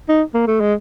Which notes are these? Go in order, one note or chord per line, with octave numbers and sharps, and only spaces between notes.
D#4
A#3
A3
G#3